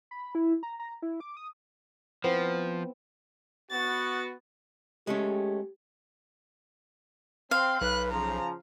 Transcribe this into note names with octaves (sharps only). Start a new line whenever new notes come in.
B5
E4
A#5
A#5
E4
D6
D#6
F3 B3 C4 E4
B3 F#4 A6
G#3 A3 C#4 G4
C4 F5 C6
B1 B4 F#6
C#3 F3 A#5